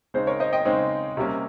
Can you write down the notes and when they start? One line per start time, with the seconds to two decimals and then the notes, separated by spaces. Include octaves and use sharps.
0.14 C#3 G#3 C4 D#4 C5
0.27 A#4 C#5
0.40 C5 D#5
0.53 D#5 G5
0.65 C#3 G#3 C4 D#4
1.17 C3 G3 A#3 C#4